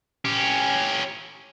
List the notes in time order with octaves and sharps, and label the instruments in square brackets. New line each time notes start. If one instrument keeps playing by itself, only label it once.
[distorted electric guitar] C#4 G4